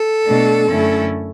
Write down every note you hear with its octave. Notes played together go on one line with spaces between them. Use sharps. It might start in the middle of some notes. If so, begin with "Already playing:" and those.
Already playing: A4
B2 A3 D4
F#2 D3 A3 C#4 E4